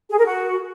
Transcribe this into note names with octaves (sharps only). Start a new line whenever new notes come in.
G#4
A#4
F#4